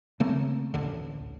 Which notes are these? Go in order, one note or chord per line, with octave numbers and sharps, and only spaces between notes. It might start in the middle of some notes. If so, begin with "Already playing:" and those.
C#3 A3 A#3 C4
A1 D2 D3